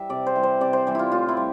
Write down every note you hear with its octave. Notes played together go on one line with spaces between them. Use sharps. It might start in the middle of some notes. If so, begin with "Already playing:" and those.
Already playing: E3 G3 E5
C3 D5
C5
E3 G3
C5
C3 D5
C5
E3 G3
E4 F4
A2 F4
E4
G3